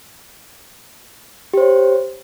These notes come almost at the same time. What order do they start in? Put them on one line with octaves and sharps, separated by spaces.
G4 C5 C#5